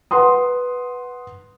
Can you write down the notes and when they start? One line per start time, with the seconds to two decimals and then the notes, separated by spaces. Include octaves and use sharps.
0.11 B4 F#5 C6 D#6